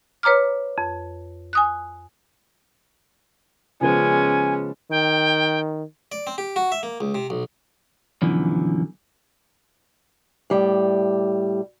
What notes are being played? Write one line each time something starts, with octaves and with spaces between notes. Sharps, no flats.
B4 C#5 A#5 D6 F6
F2
G#5 D#6 F#6
C#3 F3 G#3 B3 C#4 G#5
D#3 G5
D5
C4
G4
F#4
E5
A#3
C#2
C3
B1
F#2 B2 D3 E3 F3
A2 G3